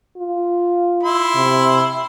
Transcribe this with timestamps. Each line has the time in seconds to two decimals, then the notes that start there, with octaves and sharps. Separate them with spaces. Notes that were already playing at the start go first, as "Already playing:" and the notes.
0.17 F4
1.03 E4 C6
1.35 C3